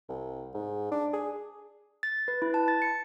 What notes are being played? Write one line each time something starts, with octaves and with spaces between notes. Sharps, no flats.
C2
G#2
D4
G#4
A6
B4
E4
A5
A6
C#7